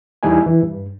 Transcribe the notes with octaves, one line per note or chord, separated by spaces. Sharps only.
E2 G3 D#4 E4 D5 G#5
E3
G2